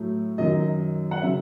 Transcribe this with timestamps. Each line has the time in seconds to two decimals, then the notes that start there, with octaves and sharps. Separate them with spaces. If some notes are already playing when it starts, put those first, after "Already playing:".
Already playing: A2 F#3 A3
0.38 F#2 D#3 F#3 D#5
1.11 F#5
1.21 C#3 F#3 E5